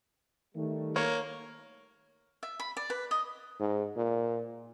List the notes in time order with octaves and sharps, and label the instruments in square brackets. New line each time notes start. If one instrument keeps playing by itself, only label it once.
[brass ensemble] D#3 G3 A3
[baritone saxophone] A#3 [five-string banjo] C#5
[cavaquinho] E5
B5
D5
B4
D#5
[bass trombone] G#2
A#2